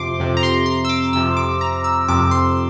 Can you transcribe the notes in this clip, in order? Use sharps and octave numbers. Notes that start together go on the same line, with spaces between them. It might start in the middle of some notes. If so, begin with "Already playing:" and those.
Already playing: F2 C3 F3 C6 D6
F2 C3 F3
A#5
C6
C6
E6
D6
F2 C3 F3 E6
D6
A#5
E6
F2 C3 F3 D6
C6